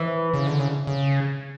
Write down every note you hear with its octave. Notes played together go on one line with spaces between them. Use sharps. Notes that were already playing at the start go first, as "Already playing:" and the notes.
Already playing: E3
C#3
D3
C#3
C#3